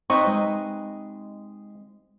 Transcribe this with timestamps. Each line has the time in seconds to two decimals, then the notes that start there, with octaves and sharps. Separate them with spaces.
0.10 C3 C4 D#4 B4 D#5 C#6
0.27 G#3